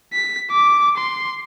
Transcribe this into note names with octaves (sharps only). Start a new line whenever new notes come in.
B6
D6
C6